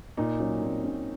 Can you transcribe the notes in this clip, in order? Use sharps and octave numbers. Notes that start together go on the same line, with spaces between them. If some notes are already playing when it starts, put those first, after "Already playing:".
A#2 D#4
F#3 C#4
A#2 C4
A#2 C#4